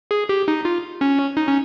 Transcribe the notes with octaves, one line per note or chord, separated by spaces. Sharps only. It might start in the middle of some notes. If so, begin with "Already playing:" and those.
G#4
G4
D#4
F4
C#4
D#4
C#4